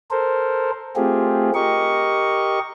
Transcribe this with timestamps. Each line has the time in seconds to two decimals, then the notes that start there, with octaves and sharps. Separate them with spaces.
0.11 A4 A#4 C5
0.96 A3 C4 F4 G4 G#4
1.55 G4 A#4 D#5 C#6